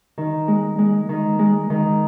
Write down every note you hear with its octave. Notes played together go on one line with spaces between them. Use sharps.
D#3
G#3
G#3
D#3
G#3
D#3